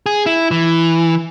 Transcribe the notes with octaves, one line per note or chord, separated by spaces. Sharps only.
G#4
E4
E3